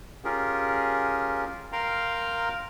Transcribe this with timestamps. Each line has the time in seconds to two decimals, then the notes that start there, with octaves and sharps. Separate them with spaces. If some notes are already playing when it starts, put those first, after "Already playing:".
0.24 C#4 F4 G4 G#4 A#4
1.72 A#4 F5 G5 A#5 C6